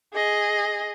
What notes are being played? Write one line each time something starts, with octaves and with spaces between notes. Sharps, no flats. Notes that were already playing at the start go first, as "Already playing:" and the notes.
G#4 D#5